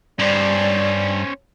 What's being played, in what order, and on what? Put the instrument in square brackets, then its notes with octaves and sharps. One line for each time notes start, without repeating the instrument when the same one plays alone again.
[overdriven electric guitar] G2 [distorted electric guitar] C#4 C5 [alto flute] D5